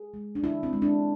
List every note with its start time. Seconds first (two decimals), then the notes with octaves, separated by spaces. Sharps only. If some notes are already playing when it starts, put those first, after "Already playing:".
Already playing: G#4
0.14 G#3
0.35 D4
0.42 D3 E4
0.63 C4
0.73 G#3
0.82 D4